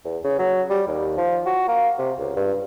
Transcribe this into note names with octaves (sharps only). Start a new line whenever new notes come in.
E2
C#3
F#3
G3
D#2
F3
F#4
A#3
C3
C#2
G2